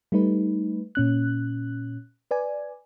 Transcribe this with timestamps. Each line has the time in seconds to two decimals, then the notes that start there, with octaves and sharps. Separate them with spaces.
0.12 G3 A3 D#4 B4
0.95 A#2 C#4 F#6
2.31 B4 D5 G#5